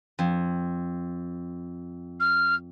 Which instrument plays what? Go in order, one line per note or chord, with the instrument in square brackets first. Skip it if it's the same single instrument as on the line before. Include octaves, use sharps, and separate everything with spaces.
[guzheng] F2
[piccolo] F6